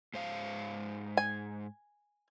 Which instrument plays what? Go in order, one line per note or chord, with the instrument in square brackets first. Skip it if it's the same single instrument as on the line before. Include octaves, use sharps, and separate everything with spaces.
[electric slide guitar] G#2 C5 F5
[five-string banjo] G#5